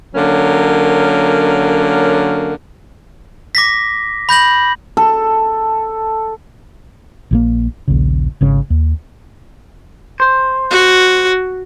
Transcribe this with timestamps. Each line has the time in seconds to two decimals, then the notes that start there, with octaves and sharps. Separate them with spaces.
0.15 D3 F#3 A#3 C#4 A#4
3.55 D6 A#6 B6
4.29 B5 G6 A#6 F#7
4.97 A4
7.31 A#1 C#3 A#3
7.88 A#1 D#2 C#3
8.41 G#1 C#3 C#4
8.70 D#2
10.20 C5
10.70 F#4